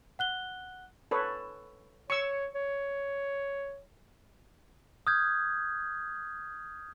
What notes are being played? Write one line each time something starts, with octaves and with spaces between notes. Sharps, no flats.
F#5 F#6 G7
A4 B4 C#5
C#5 C#6 E6
C#5
D#6 F6 G6 G#6